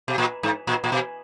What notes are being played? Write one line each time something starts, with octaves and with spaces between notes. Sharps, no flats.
B2
A#2
G#2
A#2
A#2
B2